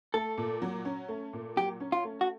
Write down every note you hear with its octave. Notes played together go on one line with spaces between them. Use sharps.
A3 A4
A#2
F#3
C#4
A3
A#2
F#3 G4
C#4
F4
A3
F#4